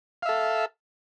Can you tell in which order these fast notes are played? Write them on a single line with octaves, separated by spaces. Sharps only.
F5 E5 A4